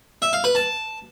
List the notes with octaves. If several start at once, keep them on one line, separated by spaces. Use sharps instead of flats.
E5
F5
B4
A5